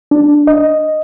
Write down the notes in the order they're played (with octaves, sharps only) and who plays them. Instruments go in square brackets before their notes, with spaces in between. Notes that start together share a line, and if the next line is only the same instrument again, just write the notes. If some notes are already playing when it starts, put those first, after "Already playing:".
[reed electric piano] D4
D#5